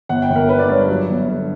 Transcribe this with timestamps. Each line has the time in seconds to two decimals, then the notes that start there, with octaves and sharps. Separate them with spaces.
0.09 G1 F#5
0.22 G5
0.30 G1
0.36 A#4
0.49 D3 B4
0.59 D5
0.69 G2 C#5
0.89 F#3
1.09 G1
1.28 D3